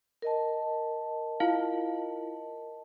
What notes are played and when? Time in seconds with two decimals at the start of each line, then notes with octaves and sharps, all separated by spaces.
0.22 A#4 D#5 A5
1.40 E4 F4 F5